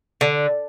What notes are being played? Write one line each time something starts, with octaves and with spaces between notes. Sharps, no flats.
D3